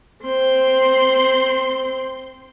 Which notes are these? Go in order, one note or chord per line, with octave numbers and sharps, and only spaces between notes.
C4 C6